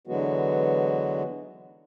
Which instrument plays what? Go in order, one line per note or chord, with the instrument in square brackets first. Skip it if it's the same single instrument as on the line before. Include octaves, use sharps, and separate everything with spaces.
[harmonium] D3 E3 F#3 G#3 B3 F#4